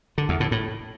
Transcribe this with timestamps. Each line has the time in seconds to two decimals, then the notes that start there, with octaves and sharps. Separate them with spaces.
0.18 D3
0.29 E2
0.40 A2
0.52 A2